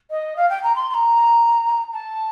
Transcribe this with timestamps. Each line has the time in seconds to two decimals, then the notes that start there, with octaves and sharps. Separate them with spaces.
0.11 D#5
0.37 F5
0.50 G5
0.63 A#5
0.76 C6
0.90 C6
0.94 A#5
1.93 A5